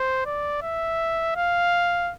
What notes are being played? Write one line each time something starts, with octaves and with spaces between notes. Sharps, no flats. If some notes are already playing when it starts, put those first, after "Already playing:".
Already playing: C5
D5
E5
F5